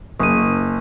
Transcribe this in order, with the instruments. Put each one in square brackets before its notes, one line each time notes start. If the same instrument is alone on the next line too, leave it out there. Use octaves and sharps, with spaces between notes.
[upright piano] F#1 [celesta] D#6 D#7